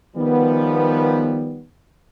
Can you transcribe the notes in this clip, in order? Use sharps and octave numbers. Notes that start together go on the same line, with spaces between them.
D#3 F3 G3 B3